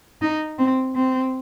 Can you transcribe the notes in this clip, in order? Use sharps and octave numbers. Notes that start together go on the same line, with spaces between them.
D#4
C4
C4